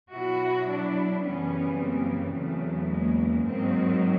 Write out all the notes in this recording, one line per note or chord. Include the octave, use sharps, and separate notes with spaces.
B2 F#3 E4 F#4
D4 E4
F#2 C#3 E3 G3 B3 C#4
A#3 C4
E2 C#3 F#3 A3
G#3 A#3
G#2 D#3 F#3 A#3 C4